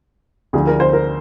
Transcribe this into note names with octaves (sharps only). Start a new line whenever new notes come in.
D2 D3 F3 G#4
A#4
C5
A#4